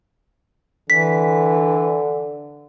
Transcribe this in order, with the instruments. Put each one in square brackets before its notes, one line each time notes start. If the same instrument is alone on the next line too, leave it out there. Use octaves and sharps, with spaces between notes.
[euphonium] D3 [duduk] E3 [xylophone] B6